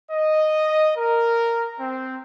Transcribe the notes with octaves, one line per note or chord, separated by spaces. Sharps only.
D#5
A#4
C4